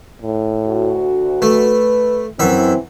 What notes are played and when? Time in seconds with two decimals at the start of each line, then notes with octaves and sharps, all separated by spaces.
0.22 A2
0.67 D2 F#4
1.42 A3 B4
2.40 F#2 E3 C4 E4 E5